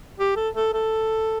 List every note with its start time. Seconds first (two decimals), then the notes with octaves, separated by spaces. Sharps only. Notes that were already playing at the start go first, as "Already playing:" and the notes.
0.19 G4
0.36 A4
0.56 A4
0.74 A4